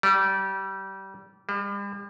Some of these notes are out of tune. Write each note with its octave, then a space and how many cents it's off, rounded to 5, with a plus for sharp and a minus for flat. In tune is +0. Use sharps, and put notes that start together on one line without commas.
G3 -25
G3 +40